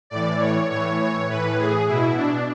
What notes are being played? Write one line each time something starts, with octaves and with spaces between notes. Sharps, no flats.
A2 E3 D5
C#5
A2 E3 C#5
C#5
A2 E3 B4
G#4
B2 E4
D4